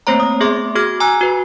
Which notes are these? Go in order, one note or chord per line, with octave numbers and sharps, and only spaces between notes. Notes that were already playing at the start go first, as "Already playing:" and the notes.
A3 A#3 C4 C5 C#5 A#5
D#6
A3 B3 G#4 E5 C6 D6
F#4 G#4 D6 F6 G#6 A#6
G#5 A#5 E6 F#6
F#4 B4